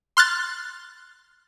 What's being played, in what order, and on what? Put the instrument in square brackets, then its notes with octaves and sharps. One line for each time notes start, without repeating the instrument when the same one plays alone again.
[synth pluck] C6 F6 F#6 A6